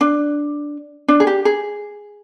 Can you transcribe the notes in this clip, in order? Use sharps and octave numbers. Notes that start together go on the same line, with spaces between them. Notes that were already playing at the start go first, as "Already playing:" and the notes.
D4
D4
G#4
G4
G#4